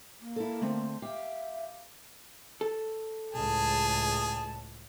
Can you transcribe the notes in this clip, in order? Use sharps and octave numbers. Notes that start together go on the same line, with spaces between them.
A#3
E4 A4
D3 A3 C4
G4 E5 F5
A4
C#2 A2 G#4 A5